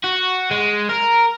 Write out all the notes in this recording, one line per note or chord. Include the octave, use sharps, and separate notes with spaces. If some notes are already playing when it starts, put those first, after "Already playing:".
F#4
G#3
A#4